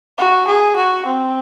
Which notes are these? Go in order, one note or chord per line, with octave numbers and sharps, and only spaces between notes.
F#4
G#4
F#4
C4